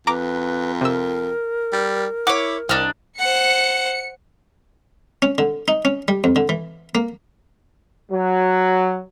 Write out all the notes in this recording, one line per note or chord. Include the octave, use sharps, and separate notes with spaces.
F2 B4 A#5 D6
C3 A#4 E6
G3
E4 C#5 F#5 D6
C2 G3 D4 D#4 F6 A#6
C5 F#5 C#7
C#4
D3
D#4
C#4
G3
F2
D3
E3
A#3
F#3